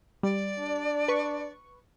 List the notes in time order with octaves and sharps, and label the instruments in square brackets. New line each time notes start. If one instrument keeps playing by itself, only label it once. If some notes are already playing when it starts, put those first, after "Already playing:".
[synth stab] G3 [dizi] D5
[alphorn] D4
[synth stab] B4 C#6